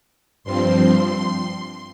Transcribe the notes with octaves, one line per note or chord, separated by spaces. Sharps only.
G2 F3 C4 C6